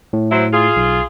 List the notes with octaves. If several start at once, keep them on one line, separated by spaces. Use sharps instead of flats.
A2
F#3 E4 C5
F4 G#4
B1